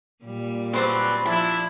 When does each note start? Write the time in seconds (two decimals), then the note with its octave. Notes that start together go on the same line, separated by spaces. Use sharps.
0.24 A#2 G3
0.73 F#3 C4 C#4 B4 C5 D5
1.26 F3 D4 E4 B5